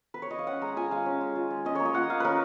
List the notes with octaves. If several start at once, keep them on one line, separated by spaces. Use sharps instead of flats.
B4
C#5
D#5
F5
C#4 F#5
G#3 A#5
F4 G#5
G#3 F5
C#4
G#3
F4
G#3
C#4 D#5
A#3 C#5
D#5
F4 F#5
A#3 F5
C#4 A#4 B4